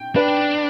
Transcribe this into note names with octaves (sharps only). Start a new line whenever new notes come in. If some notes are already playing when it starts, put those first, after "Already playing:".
Already playing: G5
D4 B4